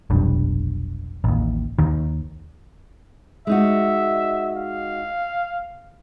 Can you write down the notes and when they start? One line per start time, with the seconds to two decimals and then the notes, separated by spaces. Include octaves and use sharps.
0.10 F1 B1 G2
1.24 A1 D#2
1.79 D#2 D#3
3.47 G#3 D#4 F#4 E5
4.57 F5